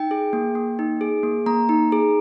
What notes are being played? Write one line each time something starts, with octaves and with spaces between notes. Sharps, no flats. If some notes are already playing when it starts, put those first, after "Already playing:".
Already playing: D#4 G5
G#4
A#3
A#3
D#4
G#4
A#3
A#3 A#5
D#4
G#4